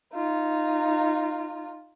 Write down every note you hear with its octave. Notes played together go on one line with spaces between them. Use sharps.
D#4 F4